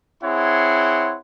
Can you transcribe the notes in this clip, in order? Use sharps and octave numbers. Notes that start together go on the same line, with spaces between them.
C4 E4 G#4 C#5 F#5 C6